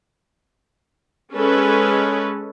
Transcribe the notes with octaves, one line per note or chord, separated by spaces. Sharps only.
G#3 C#4 A4 B4